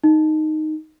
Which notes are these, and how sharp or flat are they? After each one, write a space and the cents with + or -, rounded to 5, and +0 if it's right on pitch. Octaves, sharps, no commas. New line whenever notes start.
D#4 -5